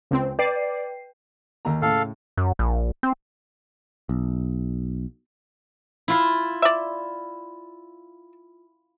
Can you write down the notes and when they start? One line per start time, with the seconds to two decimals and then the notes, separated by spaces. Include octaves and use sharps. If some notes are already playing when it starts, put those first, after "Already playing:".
0.11 C#2 C4
0.39 B4 D5 G5 C7
1.65 D#2 A#3 A#5
1.82 A2 C#3 A4 F5
2.37 F#2
2.59 A#1
3.03 C4
4.09 B1
6.08 E4 F4 C6
6.62 D5 E5